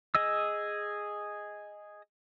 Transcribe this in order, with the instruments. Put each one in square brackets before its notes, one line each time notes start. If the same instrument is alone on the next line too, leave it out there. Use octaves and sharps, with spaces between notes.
[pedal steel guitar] G#4 D#5 E6